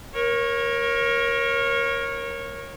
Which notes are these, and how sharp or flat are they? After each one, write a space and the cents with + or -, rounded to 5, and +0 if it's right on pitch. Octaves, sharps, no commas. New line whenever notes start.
A#4 +15 C#5 -20